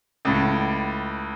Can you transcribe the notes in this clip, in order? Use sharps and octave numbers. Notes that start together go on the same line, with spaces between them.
C#2 A2